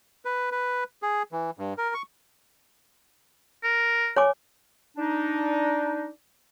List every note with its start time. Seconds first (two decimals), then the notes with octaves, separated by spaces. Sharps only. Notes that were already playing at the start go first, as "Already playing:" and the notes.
0.25 B4
0.52 B4
1.02 G#4
1.32 E3
1.58 G2
1.78 A#4
1.94 C#6
3.64 A#4
4.17 C#5 G#5 D6
4.97 D4 D#4